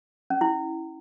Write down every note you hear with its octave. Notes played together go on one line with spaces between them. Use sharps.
C#4
E4